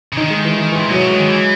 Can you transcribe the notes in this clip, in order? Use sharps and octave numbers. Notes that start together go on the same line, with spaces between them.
C#3
D#3 D#4
G#3
E3
E3
A#2 E3
B2 F#3
C#3
D#3 G#3
E3